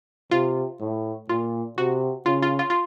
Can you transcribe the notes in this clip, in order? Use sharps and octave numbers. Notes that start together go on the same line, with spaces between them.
C3 F4
A2
A#2 F4
C3 F#4
C#3 F4
F4
F4
F4